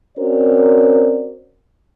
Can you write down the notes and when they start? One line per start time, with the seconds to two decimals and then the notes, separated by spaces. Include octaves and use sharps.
0.18 C4 C#4 F#4 A#4 C5 D5